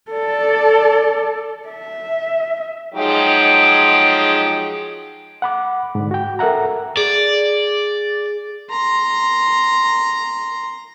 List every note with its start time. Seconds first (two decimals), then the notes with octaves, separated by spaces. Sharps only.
0.11 A4 D5
1.69 E5
2.94 F3 F#3 G#3 D#4 G4 G#4
5.42 F#5 B5 D6
5.95 G#2 D3
6.11 F#4 G5
6.39 A4 A#4 E5 F#5 A#5
6.97 G#4 D5
8.71 A#5 C6